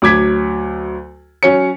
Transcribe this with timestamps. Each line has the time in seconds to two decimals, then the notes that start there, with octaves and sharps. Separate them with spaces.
0.02 D2 F#3 D6 G#6 B6
1.43 F#3 C#4 C#5 C#7